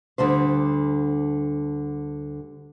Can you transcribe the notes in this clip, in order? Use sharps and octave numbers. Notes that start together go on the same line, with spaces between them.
D2 D3 G3 C5